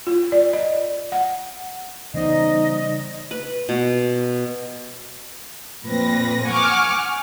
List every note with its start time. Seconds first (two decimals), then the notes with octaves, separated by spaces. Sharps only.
0.07 F4
0.32 D5
0.53 D#5
1.12 F#5
2.14 C#3 E3 G3 B3 D#4 C5 D5 D#5
3.31 B4
3.69 B2
5.85 F2 A#2 C4 B4 A#6
6.46 F#5 G#5 C#6 D6 F6